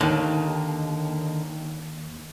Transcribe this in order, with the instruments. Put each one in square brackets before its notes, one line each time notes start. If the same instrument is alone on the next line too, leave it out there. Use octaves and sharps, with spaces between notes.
[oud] D#2 [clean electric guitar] D3 D#3